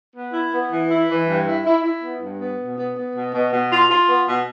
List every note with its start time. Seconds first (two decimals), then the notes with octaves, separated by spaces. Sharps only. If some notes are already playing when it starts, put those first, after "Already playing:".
0.15 B3
0.33 E4
0.52 B3
0.70 E3
0.89 E4
1.08 E3
1.27 G2
1.46 E4
1.64 E4
1.82 E4
2.02 B3
2.20 G2
2.39 B3
2.58 B2
2.76 B3
2.95 B3
3.14 B2
3.33 B2
3.51 B2
3.70 F4
3.89 F4
4.07 B3
4.26 B2